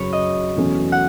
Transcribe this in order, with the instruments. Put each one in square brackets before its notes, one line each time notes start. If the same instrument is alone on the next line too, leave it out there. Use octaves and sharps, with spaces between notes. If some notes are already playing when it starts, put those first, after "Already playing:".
Already playing: [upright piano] F#2 C#3 F#3 [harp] B4 C#5
[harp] D#5
[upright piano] E2 B2 F#3 A3 C#4
[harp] F#5